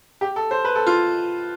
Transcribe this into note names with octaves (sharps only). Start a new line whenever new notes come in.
G4
A4
C5
B4
A4
F4